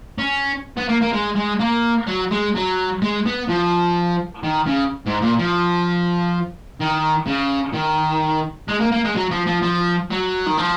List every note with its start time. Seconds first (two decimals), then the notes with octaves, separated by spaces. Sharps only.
0.18 C#4
0.77 B3
0.89 A#3
1.02 A#3
1.13 G#3
1.36 G#3
1.60 A#3
2.07 F#3
2.31 G#3
2.55 F#3
3.02 G#3
3.26 B3
3.49 F3
4.44 D#3
4.67 C#3
5.06 G#2
5.22 A#2
5.38 F3
6.80 D#3
7.26 C#3
7.74 D#3
8.68 G#3
8.80 A#3
8.92 A#3
9.04 G#3
9.15 F#3
9.31 F3
9.47 F3
9.62 F3
10.11 F#3
10.46 D#3
10.57 F3